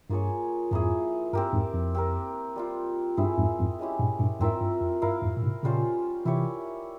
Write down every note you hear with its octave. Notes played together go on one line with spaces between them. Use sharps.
G2 A#3 F4 G#4 C#5
F2 G#2 F3 A#3 E4 G#4
G2 C4 G4 A#4
F2 G#2
F2
C4 G4 A#4
G3 C4 F4
G2 C4 E4 G#4 E5
F2 G#2
F2 G#2
G#3 C#4 E4 G4
G2 A#2
G2 A#2
F2 G#2 C4 F4 A#4 E5
G2
F2
G2 E4 A#4 F5
F2 G#2
A#2
G#2 C3
A#2 C#3 G3 C#4 F4 C5
C3 E3 E4 G4 C#5